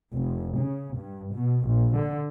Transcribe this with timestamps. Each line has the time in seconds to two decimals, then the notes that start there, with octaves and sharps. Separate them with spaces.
0.12 F1
0.57 C#3
0.99 G2
1.34 B2
1.68 A#1
1.96 D3